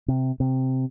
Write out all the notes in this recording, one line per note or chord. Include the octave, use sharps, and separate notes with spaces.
C3
C3